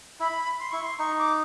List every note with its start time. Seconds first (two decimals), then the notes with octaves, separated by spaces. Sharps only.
0.20 E4 B5
0.59 C6
0.71 E4 C#6
0.83 C6
0.98 D#4 C#6
1.18 D6